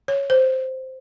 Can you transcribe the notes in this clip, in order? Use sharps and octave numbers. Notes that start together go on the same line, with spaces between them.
C#5
C5